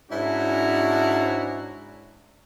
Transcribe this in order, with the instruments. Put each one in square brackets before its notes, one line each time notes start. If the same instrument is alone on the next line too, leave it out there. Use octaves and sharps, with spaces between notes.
[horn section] G#2 C#4 D4 E4 F#4 A#5